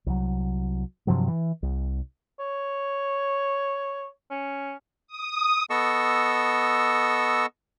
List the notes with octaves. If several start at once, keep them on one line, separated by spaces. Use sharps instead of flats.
C2 F#3
G2 C3 F3 F#3
E3
C2
C#5
C#4
D#6
B3 A4 D#5 C#6 E6